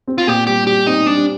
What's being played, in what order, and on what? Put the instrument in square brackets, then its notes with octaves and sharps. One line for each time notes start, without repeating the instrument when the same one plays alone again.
[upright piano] C4
[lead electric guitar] F4
[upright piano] A#2 [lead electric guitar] G4
[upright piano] G3 [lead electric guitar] G4
[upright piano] G3 [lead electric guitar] G4
[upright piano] C4 [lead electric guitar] D#4
[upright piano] G3 [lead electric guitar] D4